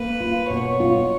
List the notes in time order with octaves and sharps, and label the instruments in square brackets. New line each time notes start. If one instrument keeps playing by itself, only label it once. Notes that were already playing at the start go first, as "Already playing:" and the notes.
Already playing: [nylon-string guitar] A#3 [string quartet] B4
[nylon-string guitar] F4
[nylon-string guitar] B2 [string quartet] C#5
[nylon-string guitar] F4